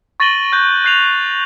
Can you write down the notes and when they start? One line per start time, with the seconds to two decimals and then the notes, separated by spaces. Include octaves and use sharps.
0.20 C#6 A6 A#6 D#7 F#7 G7
0.52 F#6 G6 A#6
0.85 F#6 C7 F7